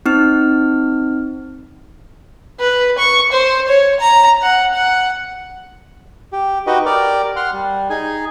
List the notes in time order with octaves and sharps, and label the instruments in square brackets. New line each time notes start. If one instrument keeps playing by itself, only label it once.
[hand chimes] C4 D#4 F6
[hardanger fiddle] B4
C#6
C5
C#5
A#5
F#5
F#5
[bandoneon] G4
D#4 F#4 G4 B4 D#5
G4 A#4 D5 D6
F#5 C6 F6
G3
D#4 G#4 G#5